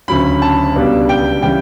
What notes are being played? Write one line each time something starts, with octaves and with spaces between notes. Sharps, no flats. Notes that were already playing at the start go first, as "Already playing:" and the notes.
D2 C#3 F#3 C#4 B5
A5
C#2 B2 G3 B3 D4
G5
C#3 E3 G3 G5